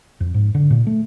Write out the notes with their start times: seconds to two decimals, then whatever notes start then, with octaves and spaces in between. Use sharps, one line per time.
0.20 F2
0.34 G#2
0.55 D3
0.71 A#2
0.87 A3